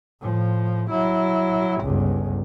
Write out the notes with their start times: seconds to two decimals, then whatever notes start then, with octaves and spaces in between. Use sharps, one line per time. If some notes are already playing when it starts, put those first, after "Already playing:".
0.21 A2 F3
0.91 F#3 E4
1.82 G1 C#2